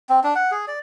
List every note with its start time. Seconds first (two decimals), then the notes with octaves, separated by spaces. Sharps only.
0.09 C4
0.24 D4
0.35 F#5
0.51 G#4
0.68 D5